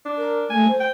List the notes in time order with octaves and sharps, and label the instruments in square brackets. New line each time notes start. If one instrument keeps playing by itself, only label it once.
[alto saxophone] D4
[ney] A#4
[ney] A3 [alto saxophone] G#5
[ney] C5
[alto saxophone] G5